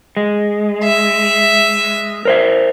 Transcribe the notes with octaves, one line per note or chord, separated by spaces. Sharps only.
G#3
E5
A#4 C5 E5